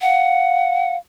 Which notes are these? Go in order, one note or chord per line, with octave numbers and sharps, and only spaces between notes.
F5 F#5